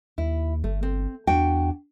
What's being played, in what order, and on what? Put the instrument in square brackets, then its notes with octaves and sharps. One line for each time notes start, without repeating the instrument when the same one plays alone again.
[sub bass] D#2 [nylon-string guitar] E4
[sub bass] G1 [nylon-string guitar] A3
[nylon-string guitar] C4
[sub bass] E2 [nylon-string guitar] D4 F#4 G5